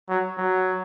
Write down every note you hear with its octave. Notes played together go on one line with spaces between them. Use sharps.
F#3
F#3